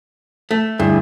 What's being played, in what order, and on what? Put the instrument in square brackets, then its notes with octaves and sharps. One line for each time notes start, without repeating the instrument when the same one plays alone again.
[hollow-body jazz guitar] A3
[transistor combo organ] D2 E4 G#4 [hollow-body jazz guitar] G2